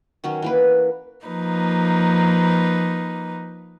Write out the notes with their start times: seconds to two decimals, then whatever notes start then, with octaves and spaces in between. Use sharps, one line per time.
0.24 D#3 F#3 C#4
0.42 E3 A#3 B4
1.26 F3 A#3 D#4 B4